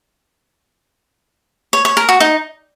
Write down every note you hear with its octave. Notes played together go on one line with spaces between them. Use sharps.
C#5
C#5
A#4
F#4
D#4